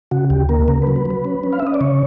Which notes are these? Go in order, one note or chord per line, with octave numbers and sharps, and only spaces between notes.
C#3 F#4
D2 G4
A#3 A#4
C#3 A#4
B4
F#3
B4
F#3
B4
C#4
C#4
F5
E5
C#4 D#5
D5
C#3 C#5